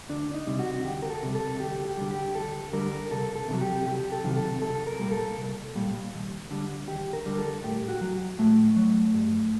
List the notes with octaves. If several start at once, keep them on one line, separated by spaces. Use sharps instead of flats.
D2 D4
D#4
C3 G3
F#4
D2 G4
A#4
A4
C3 G3
A4
D2 G4
G4
D3 G3
G4
D2 A4
D3 G3 A#4
C2 A4
A4
C3 D#3
F#3
G4
C2 G4
A4
C3 D#3 F#3
A4
C2 A4
A#4
A#2 G3
A4
C2
A#2 G3
D#2
D3 G3
D#2 G4
A#4
D3 G3
A4
A2 G4
F#4
F#3
A2 A3
F#3
G2